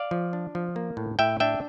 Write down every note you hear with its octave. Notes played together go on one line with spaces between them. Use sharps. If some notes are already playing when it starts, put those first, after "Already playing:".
Already playing: D5 F5
F3
D4
F3
A#3
A2
A2 E5 G5
D4 E5 G5